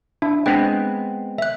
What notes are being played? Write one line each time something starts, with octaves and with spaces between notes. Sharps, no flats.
D4 E4
G#3 B3 C4 D4 G5
E5 F#6